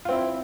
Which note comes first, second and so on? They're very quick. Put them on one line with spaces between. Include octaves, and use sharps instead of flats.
F4 C4 E4